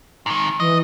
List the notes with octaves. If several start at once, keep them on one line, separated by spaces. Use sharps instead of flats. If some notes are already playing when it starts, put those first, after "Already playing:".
G#2 D#3
E3 D#5